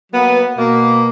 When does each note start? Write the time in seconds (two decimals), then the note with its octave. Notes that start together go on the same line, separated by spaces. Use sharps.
0.12 F#3 A#3 B3
0.57 B2 A#3